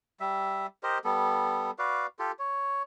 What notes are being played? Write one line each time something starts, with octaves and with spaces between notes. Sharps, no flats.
G3 E5
G4 A#4 C5 D#5
G3 B3 A4
F#4 B4 D5 F5
F4 G4 A4
C#5